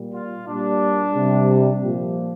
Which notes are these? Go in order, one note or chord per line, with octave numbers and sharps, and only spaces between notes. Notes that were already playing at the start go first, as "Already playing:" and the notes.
Already playing: A#2 G3
F4
A#2 G3 D4
C3 G3
A#2 F3 G4